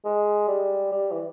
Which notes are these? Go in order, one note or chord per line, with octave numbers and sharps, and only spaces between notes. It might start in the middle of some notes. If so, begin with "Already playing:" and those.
G#3
G3
G3
E3